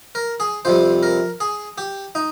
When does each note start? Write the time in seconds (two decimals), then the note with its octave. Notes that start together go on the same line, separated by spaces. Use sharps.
0.15 A#4
0.40 G#4
0.65 F2 C3 G3 C5
1.03 A#4
1.40 G#4
1.78 G4
2.15 D#4